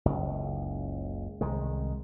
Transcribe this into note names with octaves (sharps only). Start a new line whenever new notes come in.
F#1 C#2
C2 D#3 G#3